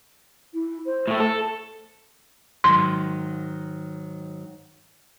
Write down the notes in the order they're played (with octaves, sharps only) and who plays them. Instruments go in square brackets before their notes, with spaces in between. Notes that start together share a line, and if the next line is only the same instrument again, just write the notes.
[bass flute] E4
C5
[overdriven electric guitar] A2 A3
[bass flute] A3 [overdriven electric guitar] A4
[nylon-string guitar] G#2 D#3 F#3 [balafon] C6